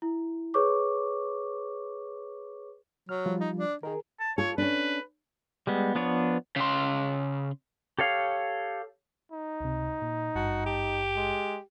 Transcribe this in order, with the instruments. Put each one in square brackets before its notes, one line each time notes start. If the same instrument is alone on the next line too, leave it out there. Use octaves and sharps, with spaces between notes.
[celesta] E4
G#4 B4 C#5 C#6 D6
[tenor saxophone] F#3 [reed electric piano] F6
[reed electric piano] F3 G3 F4
[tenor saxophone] D#4
D4
[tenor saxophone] D#3 [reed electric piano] G#4 A#4
[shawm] A5
[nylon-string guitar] F4 A4 [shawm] C#5
[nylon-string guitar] C#4 D4 [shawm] B4
[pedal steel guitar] G3 G#3 B3
F3 B3 D4 B4 C#5
[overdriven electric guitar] C#3 C6
[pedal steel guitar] G4 A4 C#5 F5
[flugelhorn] D#4
[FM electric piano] C#2 C3
A#2
[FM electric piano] G#1 G2 A5 [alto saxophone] F#4
[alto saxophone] G4
[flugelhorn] G#3